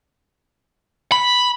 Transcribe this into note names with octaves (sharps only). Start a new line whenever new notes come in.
B5